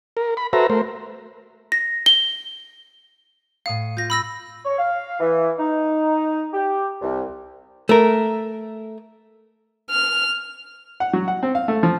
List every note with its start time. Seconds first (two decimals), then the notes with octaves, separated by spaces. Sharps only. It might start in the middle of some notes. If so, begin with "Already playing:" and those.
0.17 A#4
0.37 B5
0.53 F#4 A4 B4 C5 E5 A#5
0.70 A3 A#4 C5
1.72 A#6
2.06 G7
3.66 A2 F5 D#6 C#7
3.97 F4 G6 A#6
4.10 B5 E6 A#6
4.65 C#5
4.79 F5
5.20 E3
5.59 D#4
6.53 G4
7.02 C2
7.89 A3 A#4
9.91 F6
11.00 F#5
11.13 F#3
11.28 F#5
11.43 C4
11.55 F5
11.68 A3
11.83 F3